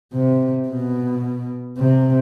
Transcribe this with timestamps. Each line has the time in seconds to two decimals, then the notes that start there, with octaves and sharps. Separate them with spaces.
0.13 C3
0.68 B2
1.78 C3